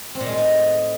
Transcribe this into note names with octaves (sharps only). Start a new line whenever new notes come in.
C4
A#2
G#3
A2
D#4